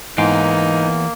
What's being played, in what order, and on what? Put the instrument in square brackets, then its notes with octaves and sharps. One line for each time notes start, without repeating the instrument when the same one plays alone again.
[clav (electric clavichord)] G#2 F5 G5 [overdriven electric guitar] E3 B3 [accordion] A#3 [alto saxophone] D#4